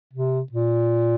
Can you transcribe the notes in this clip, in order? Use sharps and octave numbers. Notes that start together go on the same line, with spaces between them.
C3
A#2